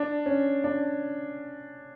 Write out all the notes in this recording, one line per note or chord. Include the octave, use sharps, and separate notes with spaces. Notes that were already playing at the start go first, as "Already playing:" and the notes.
Already playing: D4
C#4
D4